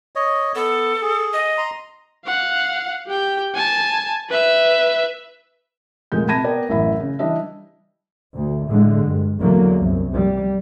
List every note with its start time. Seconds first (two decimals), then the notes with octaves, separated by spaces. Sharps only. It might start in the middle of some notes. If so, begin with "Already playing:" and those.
0.16 C#5 D#5
0.55 B3 A4
1.02 G#4
1.33 D#5
1.58 A#5 C6
2.25 F5 F#5
3.07 G4 G5
3.55 G#5 A5
4.29 B4 E5
6.12 F1 A#2 F3 G#3 G6
6.28 C3 A5 B5 G#6 A#6 D#7
6.44 B3 A#4 D5 G5
6.69 A1 F#2 E3 E5 B5
7.00 C#3
7.19 E3 G3 D4 D#5 E5
8.34 D2
8.67 A2 D3 G#3
9.02 G2
9.40 E2 D3 F#3 A#3
9.78 C2 F#2
10.14 G3